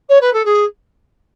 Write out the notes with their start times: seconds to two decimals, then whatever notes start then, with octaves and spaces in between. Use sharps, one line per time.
0.09 C#5
0.21 B4
0.33 A4
0.45 G#4